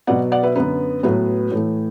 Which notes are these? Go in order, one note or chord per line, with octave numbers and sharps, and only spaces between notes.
B2 F#3 B3 D5 F#5
D5 F#5
B4 E5
F#2 D3 B3 B4
A2 F#3 B3 B4
A2 E3 A3